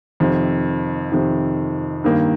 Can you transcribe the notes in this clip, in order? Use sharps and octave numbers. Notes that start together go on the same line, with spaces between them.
F2 C3 D#3
F2 C3 D#3
G2 D#3 A#3